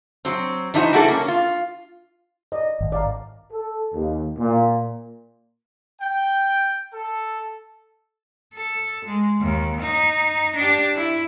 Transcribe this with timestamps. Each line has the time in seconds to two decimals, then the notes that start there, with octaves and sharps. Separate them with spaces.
0.25 F#3 C4
0.74 E3 D4 D#4 F#4 C5
0.93 G3 A#3 E4 F#4 G#4 A4
1.08 A#3 C#4
1.28 F4
2.52 D5 D#5
2.81 G#1
2.92 D5 F5 A#5
3.52 A4
3.94 D#2
4.39 A#2
6.01 G5
6.93 A4
8.54 A4
9.05 G#3
9.40 D#2
9.81 D#4
10.56 D4 G4
10.95 E4